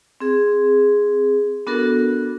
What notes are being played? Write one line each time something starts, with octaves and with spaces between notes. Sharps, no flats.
C4 G#4
B3 D4 F#4 A4 A#4